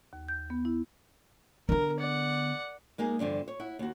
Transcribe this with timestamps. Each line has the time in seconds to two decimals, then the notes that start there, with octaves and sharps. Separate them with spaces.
0.13 D#2
0.29 G6
0.50 B3
0.65 E4
1.69 D3 B3 A#4
2.00 D5 F#5
2.98 G#3 A#3 D#4 G#4
3.19 E2 G2 D3 F3
3.48 C#5
3.60 E4 F#5
3.79 D#2 F#4